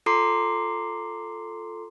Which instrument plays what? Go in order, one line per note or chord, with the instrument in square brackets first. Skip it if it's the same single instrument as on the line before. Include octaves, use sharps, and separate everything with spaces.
[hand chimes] F4 A4 A#5 C6 D6 C7